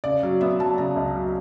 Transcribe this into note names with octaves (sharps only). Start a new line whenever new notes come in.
C#3 D5
F#3
B3 E5
F#3 A5
C#3 A#5
C#2
F#3